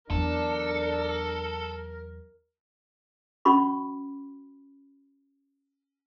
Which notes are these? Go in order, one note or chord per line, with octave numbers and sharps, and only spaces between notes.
E2 F#3 D4 A4 A#4
C#4 F#4 B5 C#6